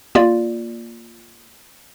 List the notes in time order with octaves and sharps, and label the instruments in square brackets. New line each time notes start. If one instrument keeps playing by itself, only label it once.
[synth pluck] A#3 F4 D5